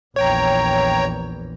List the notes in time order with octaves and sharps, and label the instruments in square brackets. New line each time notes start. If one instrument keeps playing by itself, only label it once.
[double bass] A#1 E2 [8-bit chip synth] C#5 G5 A#5